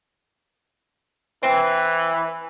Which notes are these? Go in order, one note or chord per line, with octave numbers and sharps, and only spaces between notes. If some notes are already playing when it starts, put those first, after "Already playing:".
E3 C4